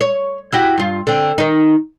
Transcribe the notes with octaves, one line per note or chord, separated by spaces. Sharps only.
C#5
E4 F#4 G4
G2 F4
D3 C4
D#3 D#4